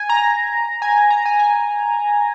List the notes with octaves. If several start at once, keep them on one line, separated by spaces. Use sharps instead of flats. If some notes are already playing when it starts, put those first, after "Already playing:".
Already playing: G#5
A#5
G#5
A#5
G#5
G#5